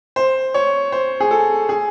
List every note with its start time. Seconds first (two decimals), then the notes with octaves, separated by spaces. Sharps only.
0.16 C5
0.54 C#5
0.92 C5
1.20 G#4
1.31 A4
1.69 G#4